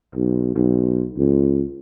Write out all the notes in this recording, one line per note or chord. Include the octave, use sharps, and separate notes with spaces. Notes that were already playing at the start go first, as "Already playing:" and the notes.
B1
B1
C#2